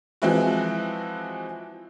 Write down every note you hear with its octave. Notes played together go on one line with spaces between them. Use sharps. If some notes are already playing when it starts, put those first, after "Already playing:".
E3 F3 G#3 C4 E4 F#4